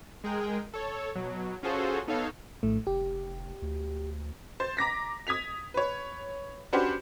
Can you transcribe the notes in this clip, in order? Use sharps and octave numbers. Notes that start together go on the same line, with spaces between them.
G#3 G#4 A#4 G5
A4 C#5
B2 F#3
C#4 F4 F#4 G#4 A4 C5
B3 D#4 A4 C#5 F5
A#1 A2 A3
F1 G4
D2
C5 A6
A#5 D6 A#6 B6
D#6 G#6 B6 F7
B4 C#5
C#4 D4 F#4 G4 B4 C5